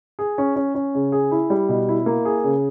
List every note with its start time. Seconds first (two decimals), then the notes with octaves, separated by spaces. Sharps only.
0.19 G#4
0.38 C#4
0.56 C#4
0.75 C#4
0.95 C#3
1.12 G#4
1.31 E4
1.50 G3
1.69 B2
1.89 E4
2.06 A#3
2.25 G#4
2.44 C#3